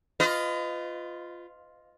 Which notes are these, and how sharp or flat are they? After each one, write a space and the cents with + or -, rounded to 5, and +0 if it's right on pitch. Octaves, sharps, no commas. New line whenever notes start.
F4 +0 B4 +40 D#5 +0